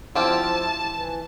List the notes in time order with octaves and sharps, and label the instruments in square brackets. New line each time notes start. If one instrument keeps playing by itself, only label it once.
[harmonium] F3 E4 [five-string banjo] C4 G4 F5 [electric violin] A5
[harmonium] E3